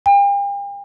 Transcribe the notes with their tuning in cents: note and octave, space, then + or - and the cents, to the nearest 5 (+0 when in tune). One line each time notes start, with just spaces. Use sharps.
G5 +40